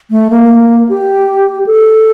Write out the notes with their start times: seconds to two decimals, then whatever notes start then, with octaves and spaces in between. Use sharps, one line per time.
0.11 A3
0.30 A#3
0.89 G4
1.66 A4